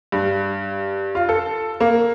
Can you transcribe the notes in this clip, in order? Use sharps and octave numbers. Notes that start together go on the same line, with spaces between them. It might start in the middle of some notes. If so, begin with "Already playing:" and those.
G2
F4
A4
A#3